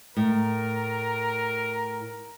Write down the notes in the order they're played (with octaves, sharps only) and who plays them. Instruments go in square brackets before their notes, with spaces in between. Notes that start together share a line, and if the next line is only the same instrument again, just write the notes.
[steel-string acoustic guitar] A2 [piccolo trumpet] A#4